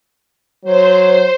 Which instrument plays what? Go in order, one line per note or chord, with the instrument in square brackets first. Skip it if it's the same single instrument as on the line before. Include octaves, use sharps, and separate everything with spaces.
[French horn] F#3 [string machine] C5 [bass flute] C#5